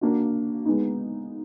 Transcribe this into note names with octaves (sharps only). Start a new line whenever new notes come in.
A#3 D4 F#4
G#3 B3 D#4